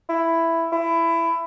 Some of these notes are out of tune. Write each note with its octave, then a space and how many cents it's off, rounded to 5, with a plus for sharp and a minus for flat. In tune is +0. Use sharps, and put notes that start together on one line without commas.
E4 +5
E4 +20